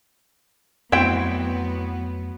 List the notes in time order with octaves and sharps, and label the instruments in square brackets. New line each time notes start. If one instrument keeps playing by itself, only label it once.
[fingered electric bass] F2 A3 [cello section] F#3 B3 [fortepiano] C4 F#4 [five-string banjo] E4 G5